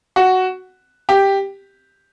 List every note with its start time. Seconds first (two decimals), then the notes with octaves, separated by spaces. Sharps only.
0.16 F#4
1.09 G4